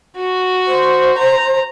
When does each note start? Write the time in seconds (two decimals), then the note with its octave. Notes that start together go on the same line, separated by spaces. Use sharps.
0.17 F#4
0.67 C5
1.18 A#5